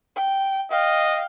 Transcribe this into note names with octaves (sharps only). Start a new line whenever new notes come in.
G5
D#5 F5 G5